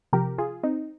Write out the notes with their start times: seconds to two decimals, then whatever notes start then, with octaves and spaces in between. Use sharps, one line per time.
0.13 C3 F3 G4 A#4
0.38 F4 G#4
0.63 C4 D#4